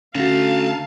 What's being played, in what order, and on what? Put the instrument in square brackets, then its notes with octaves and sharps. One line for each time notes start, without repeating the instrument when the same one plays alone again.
[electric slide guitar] D3 A3 [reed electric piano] C#4 F#4 [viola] F5 [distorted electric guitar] A5 A#5